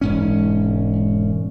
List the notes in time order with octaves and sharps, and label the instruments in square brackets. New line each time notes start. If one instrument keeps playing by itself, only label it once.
[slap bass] E1 G#2 C#4